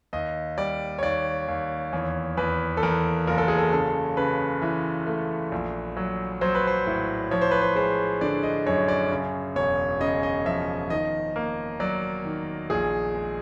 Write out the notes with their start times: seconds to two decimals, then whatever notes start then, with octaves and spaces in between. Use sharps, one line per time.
0.13 D#2 D#5
0.58 G3 D5
0.99 C#5
1.03 D#2 D5
1.48 D#2
1.93 E2 C#5
2.37 E2 B4
2.77 A4
2.83 E2 A#4
3.27 F#1 A#4
3.38 A4
3.48 G#4
3.58 A4
3.72 C#3 A4
4.17 C#3 B4
4.62 E3
5.07 A3
5.52 A#1
5.97 F#3
6.41 F#3 C5
6.55 B4
6.67 C5
6.86 A2
7.31 F3 C#5
7.42 C5
7.51 B4
7.62 C5
7.76 G#3 C5
8.21 D3 D5
8.43 D#5
8.66 F#2 C#5
8.88 D5
9.11 C#3
9.56 E1 C#5
10.01 C#3 D#5
10.23 D#5
10.46 F3 E5
10.90 D#3 D#5
11.36 A#3
11.80 F#3 D5
12.25 D#3
12.70 A#1 G#4
13.15 G#3